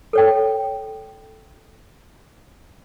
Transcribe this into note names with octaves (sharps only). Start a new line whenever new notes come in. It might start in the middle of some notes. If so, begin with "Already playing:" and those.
A4 C#5 G5